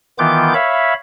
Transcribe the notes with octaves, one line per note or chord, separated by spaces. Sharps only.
D#3 E3 B3 F4 D6 G6
C#5 E5 F5 B5